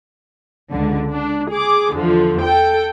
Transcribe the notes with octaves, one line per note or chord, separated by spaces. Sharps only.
C#2 D3
D4
G#4 D6
E2 D3 F3
A4 G5